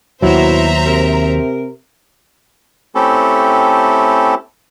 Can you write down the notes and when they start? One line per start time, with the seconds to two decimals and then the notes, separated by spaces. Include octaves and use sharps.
0.22 D#2 B2 F#3 E4 C5 E5 A#5
0.86 C3 A#4
2.95 A3 C4 C#4 E4 G4 A4